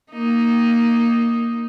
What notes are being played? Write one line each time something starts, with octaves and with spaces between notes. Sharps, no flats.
A#3 D#4